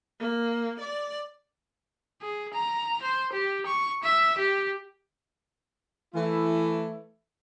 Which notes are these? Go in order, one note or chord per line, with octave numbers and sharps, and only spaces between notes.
A#3
D5
G#4
A#5
C5
G4
C#6
E5
G4
E3 A3 E4